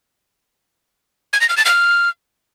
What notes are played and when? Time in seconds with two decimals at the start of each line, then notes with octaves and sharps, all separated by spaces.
1.33 G#6
1.41 A#6
1.49 F6
1.57 A6
1.65 F6